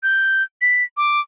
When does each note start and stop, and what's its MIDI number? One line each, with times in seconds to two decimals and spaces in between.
0.03 0.43 91
0.62 0.84 95
0.97 1.20 86